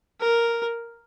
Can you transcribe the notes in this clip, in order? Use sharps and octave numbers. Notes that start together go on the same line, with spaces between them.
A#4